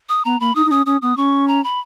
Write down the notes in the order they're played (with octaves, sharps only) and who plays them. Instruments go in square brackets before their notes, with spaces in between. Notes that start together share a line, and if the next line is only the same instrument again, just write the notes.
[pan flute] D#6
[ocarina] B3 [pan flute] A#5
[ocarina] A#3 [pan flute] B5
[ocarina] D#4 [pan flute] D#6
[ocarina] D#4
[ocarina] C#4 [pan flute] D#6
[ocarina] C#4 [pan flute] D#6
[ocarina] B3 [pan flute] D#6
[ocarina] C#4 [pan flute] C#6
[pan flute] A#5
B5